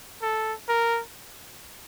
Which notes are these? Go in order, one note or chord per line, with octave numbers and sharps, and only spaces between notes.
A4
A#4